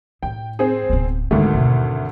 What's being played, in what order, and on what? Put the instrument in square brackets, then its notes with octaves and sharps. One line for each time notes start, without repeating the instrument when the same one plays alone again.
[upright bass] A2 [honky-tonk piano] G5
[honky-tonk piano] C4 G#4
[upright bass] D1 B3
[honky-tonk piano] G#1 D2 A3 [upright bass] G#3
[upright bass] D#2 B2